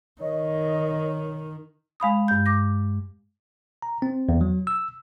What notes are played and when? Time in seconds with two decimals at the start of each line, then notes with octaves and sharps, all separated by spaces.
0.21 D#3 C#5 D#5
2.00 G#3 F5 B5 D#6
2.28 G2 G6
2.46 D6 A#6
3.82 A#5
4.02 C4
4.29 E2
4.41 F#3
4.67 E6